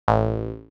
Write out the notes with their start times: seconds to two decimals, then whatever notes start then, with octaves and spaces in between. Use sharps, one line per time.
0.08 A1